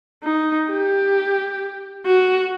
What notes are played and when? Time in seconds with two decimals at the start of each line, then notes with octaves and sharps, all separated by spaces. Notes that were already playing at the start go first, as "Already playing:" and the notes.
0.23 D#4
0.69 G4
2.06 F#4